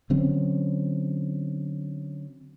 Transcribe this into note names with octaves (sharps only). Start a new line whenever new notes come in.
D3 F#3 C4 C#4